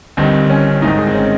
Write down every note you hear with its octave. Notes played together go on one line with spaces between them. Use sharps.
G1 G2 D#3 C4
C#4
C#4
G#1 G#2 D#3 D#4
G#4
C4
C#4